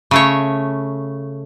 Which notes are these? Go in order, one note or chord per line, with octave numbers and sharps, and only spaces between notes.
C#3 A3 C#5